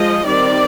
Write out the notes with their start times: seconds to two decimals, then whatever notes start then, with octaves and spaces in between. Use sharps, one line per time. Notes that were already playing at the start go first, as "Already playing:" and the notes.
Already playing: F3 G#3 D#5
0.25 D#3 G3 C4 D5